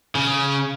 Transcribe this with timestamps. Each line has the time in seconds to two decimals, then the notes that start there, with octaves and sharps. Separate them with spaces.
0.15 C#3